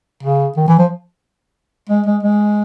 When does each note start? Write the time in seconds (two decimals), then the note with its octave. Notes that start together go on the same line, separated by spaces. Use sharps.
0.23 C#3
0.57 D#3
0.68 E3
0.79 F3
1.90 G#3
2.06 G#3
2.23 G#3